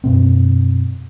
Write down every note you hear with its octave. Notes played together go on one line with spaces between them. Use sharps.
F#2 B2 C4